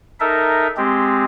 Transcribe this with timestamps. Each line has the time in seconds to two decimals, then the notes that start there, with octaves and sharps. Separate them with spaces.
0.20 D#4 A4 A#4 E5
0.77 G#3 C4 G4